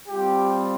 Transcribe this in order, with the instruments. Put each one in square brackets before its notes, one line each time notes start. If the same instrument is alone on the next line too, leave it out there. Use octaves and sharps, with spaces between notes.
[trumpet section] G3 C4 F4 G4